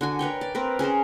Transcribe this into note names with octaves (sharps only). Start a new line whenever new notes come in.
D3 F#4 G#5
A#4 B4 C#5 G5
D5
C4 A#4 B4
C#4 G#4 A#4 C5